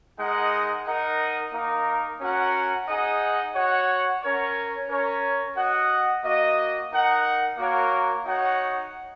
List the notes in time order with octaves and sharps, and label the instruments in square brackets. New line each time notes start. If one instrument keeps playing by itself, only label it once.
[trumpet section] G#3 D#4 A#4 D#5 F#5
D#4 A#4 D#5 F#5
A#3 D#4 A#4
C#4 F#4 A#4 F#5
D#4 G#4 D#5 F#5
F#4 C#5 F#5
C#4 A#4 C#5
C#4 A#4 C#5
F#4 D#5 F#5
A#3 F#4 D#5
D#4 A#4 F#5
A#3 F#4 A#4 C#5 F#5
D#4 F#4 C#5 F#5